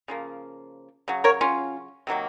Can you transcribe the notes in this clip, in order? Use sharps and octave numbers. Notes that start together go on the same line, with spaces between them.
C#3 F3 A#3
C#3 F#3
A#4 C#5
C#4 F4
C3 D#3 F#3 A#3